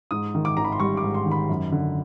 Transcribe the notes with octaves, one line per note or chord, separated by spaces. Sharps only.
G#2 D#6
D#3
D6
G#1 A#5
B5
C6
G3 C#6
D6
G#2
C6
D#3
B5
F#2
D3